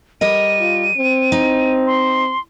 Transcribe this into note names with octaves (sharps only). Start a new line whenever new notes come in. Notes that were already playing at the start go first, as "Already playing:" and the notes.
G3 A#4 D#5 D#7
F4
C4
D#4
C6